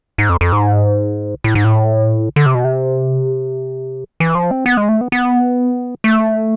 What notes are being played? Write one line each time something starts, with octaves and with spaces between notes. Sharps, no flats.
G#2
F2
F2
G#2
A2
G#2
A2
D3
C3
B2
C3
E3
F3
C4
B3
G#3
A3
B3
B3
A3